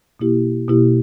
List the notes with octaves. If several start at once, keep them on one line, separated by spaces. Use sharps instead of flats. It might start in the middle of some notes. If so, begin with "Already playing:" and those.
B2 A#3 E4 G4
B2 A#3 E4 G4